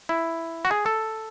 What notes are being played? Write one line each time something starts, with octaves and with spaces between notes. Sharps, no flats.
E4
F#4
G#4
A4